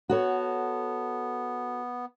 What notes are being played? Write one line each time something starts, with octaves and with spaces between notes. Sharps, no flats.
B3 F#4 A4 C#5